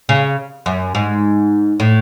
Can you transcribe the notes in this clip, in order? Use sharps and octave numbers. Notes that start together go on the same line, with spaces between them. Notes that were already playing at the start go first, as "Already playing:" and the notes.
C#3
F#2
G#2
A2